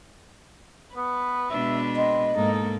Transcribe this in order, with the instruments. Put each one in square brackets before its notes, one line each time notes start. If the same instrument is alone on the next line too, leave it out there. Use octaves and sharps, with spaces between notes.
[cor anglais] B3 [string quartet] B4
[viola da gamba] B2 G#3 D4 [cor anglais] E5
[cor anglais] C4 [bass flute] D#5
[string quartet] G#2 A4 [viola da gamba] A#3 [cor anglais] D#4